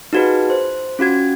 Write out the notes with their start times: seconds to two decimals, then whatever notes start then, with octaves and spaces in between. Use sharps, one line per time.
0.13 D#4 F4 F#4 G#4 B4
0.50 C5
0.99 C#4 F4 F#4 G#6